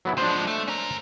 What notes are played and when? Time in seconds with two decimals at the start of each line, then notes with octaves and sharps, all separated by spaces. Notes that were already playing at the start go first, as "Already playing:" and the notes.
0.05 F#3 B3 E4
0.18 F3 G#3 D4 C5
0.47 A3
0.68 C#4 A#4